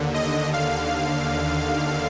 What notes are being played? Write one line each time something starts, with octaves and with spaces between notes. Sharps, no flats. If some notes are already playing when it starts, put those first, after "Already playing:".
Already playing: D#2 D3
D#5
F5